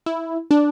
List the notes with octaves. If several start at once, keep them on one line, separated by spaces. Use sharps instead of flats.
E4
D4